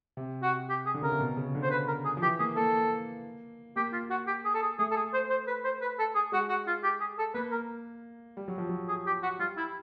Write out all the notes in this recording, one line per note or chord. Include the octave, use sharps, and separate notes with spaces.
C3
F#4
G4
G#4
D3
C#3 A#4
C3
B2
C#3
D3
C5
B4
A#4
G#4
F3
E3 G4
A#3 G#4
A#3 A4
A#3 G4
F4
F#4
G4
G#4
A4
G#4
A3 G#4
A4
G#4
C5
C5
B4
C5
B4
A4
G#4
G#3 F#4
F#4
F4
G4
G#4
A4
A#3 B4
A#4
G3
F#3
F3
F#3
G#4
G4
F#4
G3 F4
E4